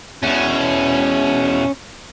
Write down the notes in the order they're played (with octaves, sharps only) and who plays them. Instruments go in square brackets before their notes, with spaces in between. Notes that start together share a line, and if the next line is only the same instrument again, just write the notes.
[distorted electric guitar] E2 B2 [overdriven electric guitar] C#4